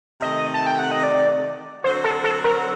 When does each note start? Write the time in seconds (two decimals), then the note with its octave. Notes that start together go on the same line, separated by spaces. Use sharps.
0.22 C3 D#3 A3 D#5
0.54 A5
0.67 G5
0.79 F#5
0.91 D#5
1.03 D5
1.84 D3 F#3 C4 F#4 C5
2.04 A4
2.24 A4
2.44 A#4